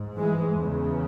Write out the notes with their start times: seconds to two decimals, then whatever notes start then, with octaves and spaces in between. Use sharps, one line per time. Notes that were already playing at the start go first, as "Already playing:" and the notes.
Already playing: G#2
0.17 E3 G#3
0.56 E2 C#3